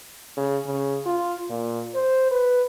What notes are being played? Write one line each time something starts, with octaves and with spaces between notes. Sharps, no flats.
C#3
C#3
F4
A#2
C5
B4